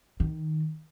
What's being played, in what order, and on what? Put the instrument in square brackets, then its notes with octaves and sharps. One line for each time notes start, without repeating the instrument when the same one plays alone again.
[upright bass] D#3